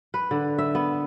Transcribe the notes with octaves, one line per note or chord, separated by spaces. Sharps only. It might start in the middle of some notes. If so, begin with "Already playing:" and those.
B4
D3
E5
B3